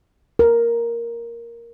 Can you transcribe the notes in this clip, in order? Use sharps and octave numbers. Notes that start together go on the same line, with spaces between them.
A#4